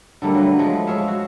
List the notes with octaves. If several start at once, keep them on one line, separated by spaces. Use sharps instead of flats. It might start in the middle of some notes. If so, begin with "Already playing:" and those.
D3 G3 A3 A#3
F#3 B4
F3 G#3 A3 G#4
G#4 C#5 E5 F5
F#4